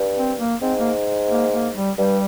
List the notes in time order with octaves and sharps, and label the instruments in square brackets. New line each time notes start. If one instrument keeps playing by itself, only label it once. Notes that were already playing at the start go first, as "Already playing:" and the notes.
Already playing: [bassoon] G2
[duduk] C4
A#3
[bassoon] G#2 [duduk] C4
[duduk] A#3
A#3
A#3
G3
[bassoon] G2 [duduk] G3